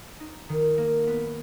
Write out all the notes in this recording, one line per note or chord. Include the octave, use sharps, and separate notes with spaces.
D#4
D#3
A#3
B3